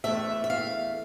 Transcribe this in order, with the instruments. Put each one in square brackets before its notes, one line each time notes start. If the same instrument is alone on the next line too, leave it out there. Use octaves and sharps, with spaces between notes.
[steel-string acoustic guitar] E2 E3 A3 E5
E5
F5